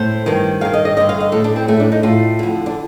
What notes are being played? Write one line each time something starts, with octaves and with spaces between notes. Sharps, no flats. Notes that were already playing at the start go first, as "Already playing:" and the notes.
Already playing: A2 C5
G2 D#3
G2 D#3 F5
D#5
D#5
G2 D3 D#5
F5
D#5
A2 A4
D4
C4
A2 A3
D4
D#4
A2 F4
F2 D3
D4